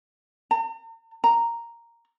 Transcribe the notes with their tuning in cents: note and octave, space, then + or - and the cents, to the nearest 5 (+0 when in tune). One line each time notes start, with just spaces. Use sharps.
A#5 -45
A#5 -5